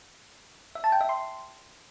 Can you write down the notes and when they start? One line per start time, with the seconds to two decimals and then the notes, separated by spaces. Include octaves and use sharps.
0.75 E5
0.84 A5
0.92 G5
1.01 E5
1.09 C6